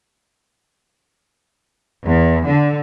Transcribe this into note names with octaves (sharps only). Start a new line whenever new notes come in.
E2
D3